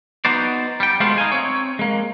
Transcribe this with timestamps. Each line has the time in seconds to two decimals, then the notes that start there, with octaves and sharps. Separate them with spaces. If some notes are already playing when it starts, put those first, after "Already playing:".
0.25 B3 D#4 F#4 C5 D5
0.80 G3 G5
1.00 G#3 A3 B3 F4 F#4 C5
1.18 D#4 F5 G#5
1.32 C4 C#5
1.79 G#3 A#3